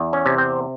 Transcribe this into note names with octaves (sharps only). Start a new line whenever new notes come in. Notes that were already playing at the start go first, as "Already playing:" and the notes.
Already playing: E2
C#4
C3
C4